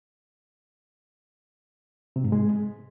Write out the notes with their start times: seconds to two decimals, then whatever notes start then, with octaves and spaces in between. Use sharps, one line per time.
2.16 C3
2.24 G#2
2.32 G#3